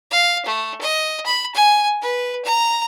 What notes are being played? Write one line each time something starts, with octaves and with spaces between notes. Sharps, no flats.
F5
A3
D#5
B5
G#5
B4
A#5